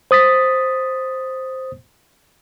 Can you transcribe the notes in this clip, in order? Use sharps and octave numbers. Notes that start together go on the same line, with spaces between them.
C5 D#6 A6 B6